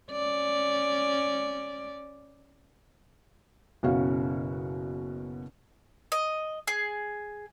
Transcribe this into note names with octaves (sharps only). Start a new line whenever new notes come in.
C#4 D5
F#1 B2 C#4 F#4 F5
D#5
G#4